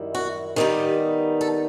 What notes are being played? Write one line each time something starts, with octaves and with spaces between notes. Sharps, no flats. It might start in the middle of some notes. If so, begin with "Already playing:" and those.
Already playing: F#2 D#3 G3 E4
F#4
D#3 G3 B3 D#4 G4
A4